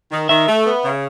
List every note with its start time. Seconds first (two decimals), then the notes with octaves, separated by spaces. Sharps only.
0.12 D#3
0.29 D#3 E5
0.47 A3
0.66 B3
0.84 C#3